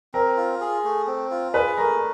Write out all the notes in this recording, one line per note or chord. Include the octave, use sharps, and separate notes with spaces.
C4 A#4 A#5
F4
G#4
A3
C4
F4
G#4 B4 B5
A3 A#4 A#5